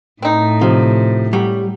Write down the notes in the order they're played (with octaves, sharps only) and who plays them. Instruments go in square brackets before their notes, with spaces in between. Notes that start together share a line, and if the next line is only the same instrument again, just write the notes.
[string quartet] A2 [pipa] C4 D#4
[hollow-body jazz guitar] C3 F3
[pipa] F#3 [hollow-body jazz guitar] G3